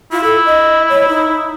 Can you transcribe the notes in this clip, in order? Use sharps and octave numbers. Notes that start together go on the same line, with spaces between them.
E4 F4
A4
D#5
C#5
D#4